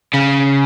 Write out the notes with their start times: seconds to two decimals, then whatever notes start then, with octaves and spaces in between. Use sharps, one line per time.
0.14 C#3